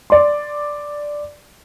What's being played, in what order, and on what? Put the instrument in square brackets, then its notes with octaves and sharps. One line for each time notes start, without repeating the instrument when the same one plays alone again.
[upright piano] D5 C6